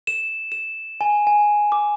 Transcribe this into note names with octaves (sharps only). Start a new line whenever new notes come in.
E7
E7
G#5
G#5
D6